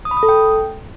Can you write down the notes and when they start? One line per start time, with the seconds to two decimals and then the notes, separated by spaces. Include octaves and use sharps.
0.05 D#6
0.11 B5
0.17 D#6
0.23 A4
0.29 G5